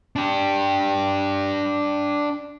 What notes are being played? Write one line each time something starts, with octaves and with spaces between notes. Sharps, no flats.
D4 G4